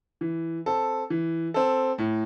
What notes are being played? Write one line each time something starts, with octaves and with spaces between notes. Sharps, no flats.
E3
C4 A4
E3
C4 A4
A2